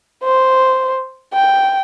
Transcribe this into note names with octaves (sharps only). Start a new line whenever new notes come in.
C5
G5